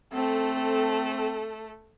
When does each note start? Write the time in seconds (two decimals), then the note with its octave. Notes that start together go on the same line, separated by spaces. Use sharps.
0.13 A3 C4 A4